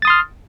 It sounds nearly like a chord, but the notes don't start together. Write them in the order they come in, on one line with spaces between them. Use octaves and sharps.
A6 D#6 C6 F6